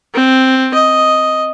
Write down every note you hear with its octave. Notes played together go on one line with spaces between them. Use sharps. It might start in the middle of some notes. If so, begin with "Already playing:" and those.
C4
D#5